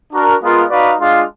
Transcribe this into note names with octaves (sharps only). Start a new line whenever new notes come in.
D4 F#4 A#4
G#3 B3 F4 A#4
D#4 F#4 B4 D5 F5
G#3 D4 F4